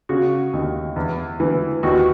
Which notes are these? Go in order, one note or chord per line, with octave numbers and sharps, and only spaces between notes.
C#3 F#4
D#2
E2
E3
D#2 F#4